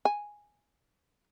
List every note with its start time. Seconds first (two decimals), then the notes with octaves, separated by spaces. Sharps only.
0.05 G#5